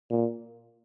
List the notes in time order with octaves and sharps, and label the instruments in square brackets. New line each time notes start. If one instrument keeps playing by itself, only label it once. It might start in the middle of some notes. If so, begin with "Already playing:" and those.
[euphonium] A#2